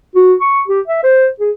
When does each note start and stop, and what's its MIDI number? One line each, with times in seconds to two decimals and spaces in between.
0.15 0.34 66
0.41 0.61 85
0.68 0.81 67
0.87 1.02 76
1.03 1.27 72
1.40 1.51 68